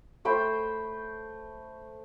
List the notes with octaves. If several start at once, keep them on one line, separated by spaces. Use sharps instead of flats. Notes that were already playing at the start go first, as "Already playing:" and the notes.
A3 C5 G5 B5